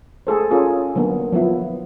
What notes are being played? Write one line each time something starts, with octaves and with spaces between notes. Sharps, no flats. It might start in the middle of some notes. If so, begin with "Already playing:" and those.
A3 G#4 A4 C5
C#4 F4 G#4 A#4
D3 F#3 A#3 B3
F3 F#3 B3 E4